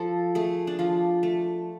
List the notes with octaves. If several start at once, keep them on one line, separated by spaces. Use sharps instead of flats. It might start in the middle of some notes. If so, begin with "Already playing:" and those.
Already playing: F3 A4
A3 G#4
D4
F3 F4
A3